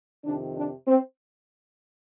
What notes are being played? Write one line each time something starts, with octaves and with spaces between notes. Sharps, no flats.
F2 C3 D#3 D4
D4
C4